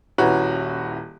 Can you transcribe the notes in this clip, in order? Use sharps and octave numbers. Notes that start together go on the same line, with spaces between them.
D#1 C#4 E4 F#4 B4 A#5